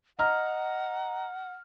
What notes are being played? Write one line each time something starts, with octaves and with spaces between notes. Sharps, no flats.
D#5 F#5 A#5 F6